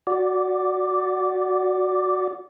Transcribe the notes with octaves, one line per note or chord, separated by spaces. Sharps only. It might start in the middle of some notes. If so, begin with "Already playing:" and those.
F#4 D5